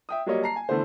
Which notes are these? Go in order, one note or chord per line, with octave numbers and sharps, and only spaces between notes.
E5 G5 D#6
F#3 G3 A#3 G4 C#5 D#5
A5 A#5 C7
G#5
D3 E3 A3 B3 C5